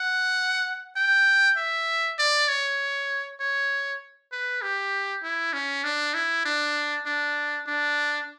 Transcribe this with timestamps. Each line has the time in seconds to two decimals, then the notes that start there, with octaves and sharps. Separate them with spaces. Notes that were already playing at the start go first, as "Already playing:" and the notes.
Already playing: F#5
0.96 G5
1.57 E5
2.19 D5
2.49 C#5
3.40 C#5
4.32 B4
4.62 G4
5.23 E4
5.53 C#4
5.84 D4
6.14 E4
6.45 D4
7.06 D4
7.67 D4